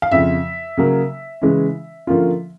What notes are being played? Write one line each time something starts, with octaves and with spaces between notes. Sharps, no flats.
F5
F2 C#3 F3 E5
C#3 F#3 A#3
C#3 E3 G#3 C#4
D3 F3 A#3 C#4 F4